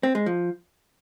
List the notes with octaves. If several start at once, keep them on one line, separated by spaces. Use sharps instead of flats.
C4
G#3
F3